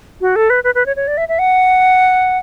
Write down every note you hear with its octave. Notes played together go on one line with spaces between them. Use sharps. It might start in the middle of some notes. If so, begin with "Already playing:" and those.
F#4
A4
B4
B4
B4
C#5
C#5
D5
E5
E5
F#5